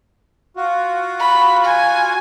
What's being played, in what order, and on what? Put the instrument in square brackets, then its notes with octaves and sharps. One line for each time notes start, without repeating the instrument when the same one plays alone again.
[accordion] F4 F#4
[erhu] B5
G#5